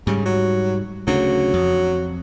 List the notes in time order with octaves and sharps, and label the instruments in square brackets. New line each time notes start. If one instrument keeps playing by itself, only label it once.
[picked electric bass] G#2 G3 [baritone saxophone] C#3
[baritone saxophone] F#3
[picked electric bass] D2 C#3 [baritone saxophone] F#3
[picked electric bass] F2